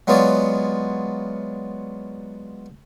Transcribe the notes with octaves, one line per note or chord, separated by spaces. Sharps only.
F#3 G#3 B3 F4 C#5 D5